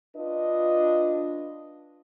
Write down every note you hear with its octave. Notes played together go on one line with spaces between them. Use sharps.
D4 F4 B4 D#5